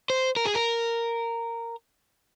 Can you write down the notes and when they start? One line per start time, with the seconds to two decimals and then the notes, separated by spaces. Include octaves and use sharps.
0.10 C5
0.36 A#4
0.46 G#4
0.55 A#4